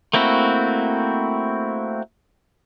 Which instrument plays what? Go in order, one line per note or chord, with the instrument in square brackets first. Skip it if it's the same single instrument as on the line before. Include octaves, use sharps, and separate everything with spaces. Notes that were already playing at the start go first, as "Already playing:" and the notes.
[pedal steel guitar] A3 A#3 C4 E4 F#4